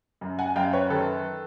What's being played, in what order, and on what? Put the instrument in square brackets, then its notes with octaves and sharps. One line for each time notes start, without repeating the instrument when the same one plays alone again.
[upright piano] F#2
F#5 G#5
F#2 F5 G5
B4 C#5
D#3 A4 B4